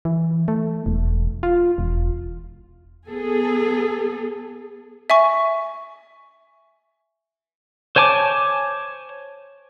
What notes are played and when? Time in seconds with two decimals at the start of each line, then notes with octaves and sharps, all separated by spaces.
0.05 E3
0.48 A3
0.86 E1
1.43 F4
1.78 E1
3.09 B3 G#4 A4
5.10 E5 G#5 C#6
7.96 C5 C#5 G#5 A5 D6